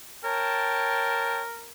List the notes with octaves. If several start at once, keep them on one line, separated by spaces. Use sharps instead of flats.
A#4 C#5 G5 A5